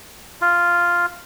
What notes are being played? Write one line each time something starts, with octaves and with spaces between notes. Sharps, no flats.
F4